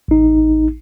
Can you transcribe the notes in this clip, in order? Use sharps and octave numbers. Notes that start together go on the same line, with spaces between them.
A1 D#4